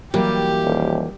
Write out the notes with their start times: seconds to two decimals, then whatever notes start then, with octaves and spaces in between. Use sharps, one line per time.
0.14 E3 F#3 G3 A#3 G4
0.64 D#1